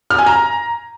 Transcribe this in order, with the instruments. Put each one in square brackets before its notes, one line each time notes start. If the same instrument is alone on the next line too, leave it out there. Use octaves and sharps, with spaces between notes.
[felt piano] F6
G#5
A#5